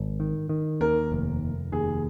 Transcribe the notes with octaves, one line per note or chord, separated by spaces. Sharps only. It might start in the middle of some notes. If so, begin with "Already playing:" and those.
Already playing: G#1
D#3
D#3
D#2 A#4
F1
F1
D#2 G#4